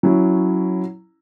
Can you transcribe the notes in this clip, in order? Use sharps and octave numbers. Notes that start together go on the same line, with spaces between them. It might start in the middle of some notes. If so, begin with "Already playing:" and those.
F#3 C#4 E4